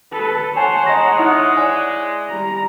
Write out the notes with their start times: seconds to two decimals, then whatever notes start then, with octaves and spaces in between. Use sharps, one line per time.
0.12 A4 B4
0.56 C5 C#5 F#5 G#5 A5
0.86 G#3 D#5 A#5 C6 A#6
1.19 D#4 E4 D#6 F#6
1.57 D5 G#5
2.29 G3 A#5